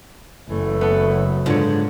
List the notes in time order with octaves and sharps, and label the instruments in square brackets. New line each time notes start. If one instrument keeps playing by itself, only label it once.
[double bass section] F#1 F#3 [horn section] E3 A3
[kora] B3 A4
[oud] G#2 [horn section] D3 [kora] F3 C#5